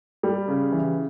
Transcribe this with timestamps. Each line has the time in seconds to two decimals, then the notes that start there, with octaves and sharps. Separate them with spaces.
0.23 G3
0.48 C#3
0.72 E3